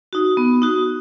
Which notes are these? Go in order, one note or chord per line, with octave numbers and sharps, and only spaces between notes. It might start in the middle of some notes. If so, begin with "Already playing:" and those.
D#4 F#4
B3
D#4 F#4